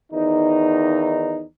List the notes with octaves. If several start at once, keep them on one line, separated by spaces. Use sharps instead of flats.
E2 D#3 D#4